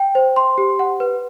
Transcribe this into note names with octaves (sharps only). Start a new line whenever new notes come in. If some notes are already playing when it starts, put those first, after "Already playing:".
Already playing: G5
C5
C6
G4
F#5
B4